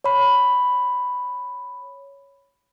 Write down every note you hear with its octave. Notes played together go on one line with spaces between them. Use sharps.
C#5 B5